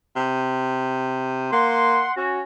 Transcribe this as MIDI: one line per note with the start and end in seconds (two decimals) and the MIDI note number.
0.16 1.50 48
1.52 2.06 58
1.52 2.13 78
1.52 2.13 84
2.17 2.42 61
2.17 2.41 66